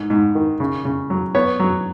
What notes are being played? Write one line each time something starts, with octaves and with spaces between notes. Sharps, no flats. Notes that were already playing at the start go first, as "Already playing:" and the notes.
Already playing: G#2
G#2
D#3
C#3
C#3
F#3
B3 C#5
F#3